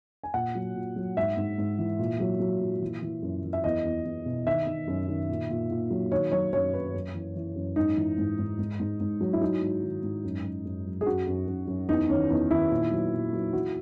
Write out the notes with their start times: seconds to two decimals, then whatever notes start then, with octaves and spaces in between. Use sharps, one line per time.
0.24 G#5
0.34 A#2 F#5
0.55 F#3
0.75 A#2
0.96 F#3
1.16 G#2 E5
1.37 G#2
1.58 G#2
1.79 E3
1.99 A#2
2.20 F#3
2.40 F#3
2.60 A#2
2.82 E3
3.02 E3
3.22 F#2
3.43 E3
3.53 E5
3.64 E2 D#5
3.85 E2
4.05 E2
4.26 B2
4.46 D#3 E5
4.67 D#3
4.88 F#2
5.08 D#3
5.29 A#2
5.50 A#2
5.70 A#2
5.90 F#3
6.12 D#3 C#5
6.32 F#3 C#5
6.53 F#2 C#5
6.73 D#3 B4
6.94 F#2
7.14 E3
7.36 E3
7.56 F#2
7.76 G#2 D#4
7.97 E3
8.18 G#2
8.38 G#2
8.59 G#2
8.80 G#2
9.00 G#2
9.21 F#3
9.33 E4
9.41 F#3 D#4
9.61 G#2
9.83 D#3
10.03 G#2
10.24 F#2
10.44 F#2
10.65 F#2
10.85 F#3
11.01 G#4
11.06 F#2 F#4
11.27 F#2
11.47 F#2
11.68 F#2
11.89 E2 D#4
12.09 D#3 C#4
12.30 E2 D#4
12.51 D#3 E4
12.71 A#2
12.91 F#3
13.13 A#2
13.33 F#3
13.53 E3 F#4